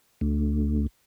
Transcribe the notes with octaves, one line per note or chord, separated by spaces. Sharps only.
D2